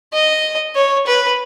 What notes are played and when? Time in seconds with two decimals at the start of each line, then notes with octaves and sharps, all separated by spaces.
0.13 D#5
0.76 C#5
1.07 B4